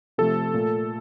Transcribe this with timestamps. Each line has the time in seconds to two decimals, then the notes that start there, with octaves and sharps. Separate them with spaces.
0.18 C3 F3 A3 A4
0.54 A#2 A3